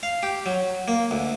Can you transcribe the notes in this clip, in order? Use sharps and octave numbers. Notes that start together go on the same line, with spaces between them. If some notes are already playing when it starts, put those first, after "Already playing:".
F5
G4
F#3
A#3
D2